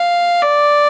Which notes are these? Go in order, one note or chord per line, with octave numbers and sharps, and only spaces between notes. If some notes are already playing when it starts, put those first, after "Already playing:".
Already playing: F5
D5